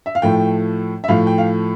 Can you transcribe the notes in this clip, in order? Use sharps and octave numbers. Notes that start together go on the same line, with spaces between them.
E5
F5
A2 F3 A3 G5
E5
A2 F3 A3 F5
G5
F5